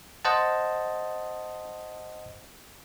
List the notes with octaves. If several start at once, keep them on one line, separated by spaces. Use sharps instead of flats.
C5 D#5 F#5 A5